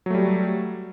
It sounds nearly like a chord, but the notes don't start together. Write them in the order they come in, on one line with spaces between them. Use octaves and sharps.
F#3 A3 G3